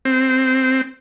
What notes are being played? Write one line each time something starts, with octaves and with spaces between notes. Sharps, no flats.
C4